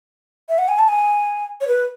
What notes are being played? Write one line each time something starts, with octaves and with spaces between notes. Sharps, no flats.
E5
F#5
G#5
A5
G#5
C#5
B4